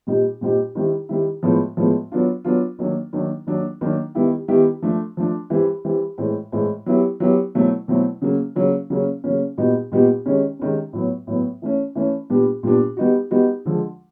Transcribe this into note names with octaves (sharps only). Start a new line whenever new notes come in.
A#2 G3 C4 D#4 G4
A#2 G3 C4 D#4 G4
D#3 G3 C4 E4
D#3 G3 C4 E4
A2 F3 G#3 B3
A2 F3 G#3 B3
F#3 B3 D4 F4
F#3 B3 D4 F4
D#3 F#3 A#3 D4
D#3 F#3 A#3 D4
D#3 F#3 A#3 D4
D#3 F#3 A#3 D4
D#3 G3 B3 E4 G4
D#3 G3 B3 E4 G4
F3 A3 D4
F3 A3 D4
E3 G3 C4
E3 G3 C4
A2 E3 G#3 C4
A2 E3 G#3 C4
F#3 B3 E4 G4
F#3 B3 E4 G4
B2 F#3 A3 C4 E4
B2 F#3 A3 C4 E4
C#3 F#3 A#3 C#4
C#3 F#3 A#3 C#4
C#3 F#3 A#3 C#4
C#3 F#3 A#3 C#4
A#2 G3 B3 D#4 F#4
A#2 G3 B3 D#4 F#4
C3 D#3 G#3 C#4
C3 D#3 G#3 C#4
A2 F#3 B3
A2 F#3 B3
E3 A3 C#4
E3 A3 C#4
A#2 G3 B3 D4
A#2 G3 B3 D4
G3 B3 D#4 F#4
G3 B3 D#4 F#4
D3 F3 G#3